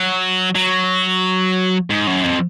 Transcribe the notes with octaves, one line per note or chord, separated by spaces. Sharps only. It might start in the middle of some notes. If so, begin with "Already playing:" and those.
Already playing: F#3
F#3
G#2
F#2
F2